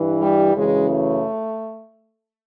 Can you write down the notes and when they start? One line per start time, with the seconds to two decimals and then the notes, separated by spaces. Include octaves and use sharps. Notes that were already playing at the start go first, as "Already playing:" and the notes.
Already playing: G2 E3
0.20 G3
0.55 F#2 C#3 E3 G#3
0.90 A3